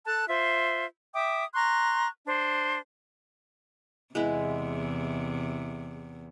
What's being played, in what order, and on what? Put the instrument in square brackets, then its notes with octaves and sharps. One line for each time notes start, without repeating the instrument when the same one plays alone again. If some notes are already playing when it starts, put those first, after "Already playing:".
[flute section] A4 A5 F#6
F4 C5 E5
E5 G5 D6 D#6
A#5 C6 C#6 F#6
D4 C5
[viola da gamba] E2 C3 [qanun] G#3 B3 E4